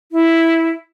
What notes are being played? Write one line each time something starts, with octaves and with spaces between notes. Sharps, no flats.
E4